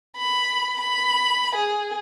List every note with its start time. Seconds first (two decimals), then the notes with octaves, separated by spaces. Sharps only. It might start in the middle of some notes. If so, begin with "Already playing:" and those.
0.18 B5
0.81 B5
1.56 G#4